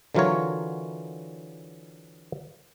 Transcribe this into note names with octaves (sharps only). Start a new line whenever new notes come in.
D3 E3 F#3 F4 A#4 C#5